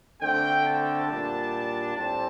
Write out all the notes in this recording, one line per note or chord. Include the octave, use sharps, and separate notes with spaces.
D3 A3 C4 G5
A5
A#2 G3 D4
A2 G3 C4 A5